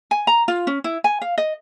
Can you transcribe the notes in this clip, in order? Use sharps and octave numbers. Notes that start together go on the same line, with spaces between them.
G#5
A#5
F4
C#4
E4
G#5
F5
D#5